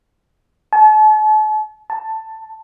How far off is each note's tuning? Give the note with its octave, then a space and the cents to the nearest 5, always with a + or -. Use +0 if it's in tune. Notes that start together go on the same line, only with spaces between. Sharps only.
A5 -40
A5 +5